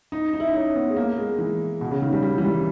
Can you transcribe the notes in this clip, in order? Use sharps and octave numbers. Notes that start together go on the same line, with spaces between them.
D#4
D#4
E4
D#4
C#4
B3
G#3
A#3
G#3
E3
B2
C#3
D#3
G3
G3
E3
G3